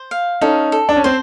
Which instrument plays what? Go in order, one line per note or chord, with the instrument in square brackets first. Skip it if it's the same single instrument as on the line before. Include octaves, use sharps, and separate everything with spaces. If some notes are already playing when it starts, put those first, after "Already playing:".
Already playing: [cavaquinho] C5
F5
[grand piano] C#4 D#4 [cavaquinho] A4
[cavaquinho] A4
[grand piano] D4
C#4
[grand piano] C4 [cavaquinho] C5